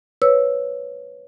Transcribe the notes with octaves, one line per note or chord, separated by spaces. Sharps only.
B4 C#5 E6